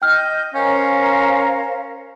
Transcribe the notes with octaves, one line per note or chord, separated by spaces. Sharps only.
D#5 G5 F6 G6
C#4 A#4 C5 F5